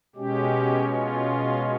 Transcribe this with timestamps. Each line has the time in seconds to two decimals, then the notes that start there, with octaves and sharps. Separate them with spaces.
0.16 B2 G#3 C#4 G4
0.93 F4